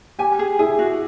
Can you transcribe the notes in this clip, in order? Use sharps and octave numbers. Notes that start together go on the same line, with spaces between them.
G4 G#5
G#4
E4 G#4
F#4